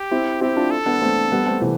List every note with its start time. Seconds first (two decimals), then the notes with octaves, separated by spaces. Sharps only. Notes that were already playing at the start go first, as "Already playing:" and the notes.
Already playing: G4
0.11 C4 E4
0.41 C4 E4 G4
0.56 D4 F4
0.71 A4
0.86 B3 D4
1.01 A3 C4
1.32 G3 B3
1.46 A3 C4
1.61 C3 E3